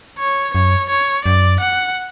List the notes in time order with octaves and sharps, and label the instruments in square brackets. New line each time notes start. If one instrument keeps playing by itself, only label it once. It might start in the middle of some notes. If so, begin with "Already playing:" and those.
[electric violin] C#5
[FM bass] F#2 [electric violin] C#5
[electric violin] C#5
[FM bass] F#2 [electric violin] D5
[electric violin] F#5